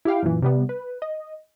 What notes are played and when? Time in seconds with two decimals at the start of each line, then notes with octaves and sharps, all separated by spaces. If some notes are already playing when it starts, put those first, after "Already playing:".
0.05 E4 G4 F5 G5
0.23 F#2 A#2 E3
0.42 C3 G3 B3
0.69 B4
1.02 D#5